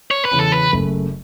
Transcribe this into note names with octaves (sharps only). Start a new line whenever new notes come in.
C#5
B4
E2 C#3 E3 C#4
A4
B4
F#1 F#2 C#3 A3